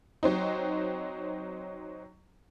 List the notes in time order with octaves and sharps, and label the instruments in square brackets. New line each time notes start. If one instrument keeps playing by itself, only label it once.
[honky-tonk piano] F#3 C4 D#4